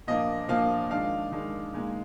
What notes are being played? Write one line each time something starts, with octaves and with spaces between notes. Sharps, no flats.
A#2 F3 A#3 D4 D#5
A#2 F3 A#3 D4 F5
D#3 G#3 D4 F5
D#3 G#3 D4
A#2 G#3 D#4